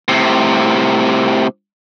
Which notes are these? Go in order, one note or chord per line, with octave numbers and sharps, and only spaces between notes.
A2 C3